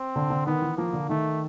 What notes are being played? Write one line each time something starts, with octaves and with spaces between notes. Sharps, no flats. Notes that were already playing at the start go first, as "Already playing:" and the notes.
Already playing: C4
D3
D3
D#3 B3
E3
F3 A#3
D3
D#3 A3